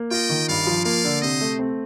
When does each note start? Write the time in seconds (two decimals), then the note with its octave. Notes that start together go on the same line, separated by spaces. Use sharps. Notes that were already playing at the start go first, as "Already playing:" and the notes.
Already playing: A#3
0.11 F4 D#5 G5
0.29 D#3
0.48 G2 D5 F5
0.67 F3
0.85 A#3 D5 F5
1.04 D3
1.22 C3 C5 D#5
1.41 A3
1.59 C4